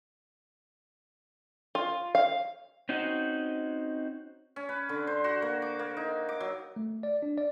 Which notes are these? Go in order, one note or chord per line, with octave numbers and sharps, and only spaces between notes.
F4
F5
C4 C#4 D#4 F#4
C#4
B4
D3
C5
F#4
A#3
D6
A#3
D#4
D6
F#3
A3
D5
D4
D5